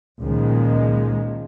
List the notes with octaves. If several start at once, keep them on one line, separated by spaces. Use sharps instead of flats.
C#2 A#2 D#3 F3 G#3